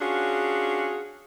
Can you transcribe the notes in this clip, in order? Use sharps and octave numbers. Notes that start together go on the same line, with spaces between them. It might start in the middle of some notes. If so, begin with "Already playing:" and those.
C#4 D4 F4 F#4 G#4